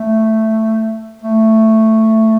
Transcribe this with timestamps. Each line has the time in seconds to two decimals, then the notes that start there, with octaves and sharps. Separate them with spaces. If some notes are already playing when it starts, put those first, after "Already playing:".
Already playing: A3
1.22 A3